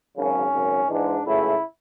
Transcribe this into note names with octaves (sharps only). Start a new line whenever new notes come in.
G#1 F#2 C#3 F#3 C#4
G#1 F#2 C#3
G#2 E3 G#3 D4
C#2 C#3 F#3 A3 E4